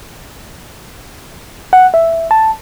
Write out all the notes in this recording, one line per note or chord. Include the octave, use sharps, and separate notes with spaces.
F#5
E5
A5